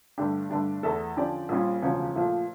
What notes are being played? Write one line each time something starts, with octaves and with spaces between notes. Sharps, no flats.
G2 D3 A3 D4 G4
G2 D3 A3 D4 G4
E2 E3 A3 E4 A4
D3 F3 C#4 G4 D5
A#1 A#2 G3 C#4 F4
E1 D2 C#3 F3 C#4
A#2 F3 A3